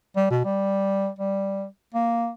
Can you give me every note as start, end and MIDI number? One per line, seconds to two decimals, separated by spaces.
0.16 0.26 55
0.30 0.45 47
0.45 1.08 55
1.19 1.65 55
1.94 2.31 58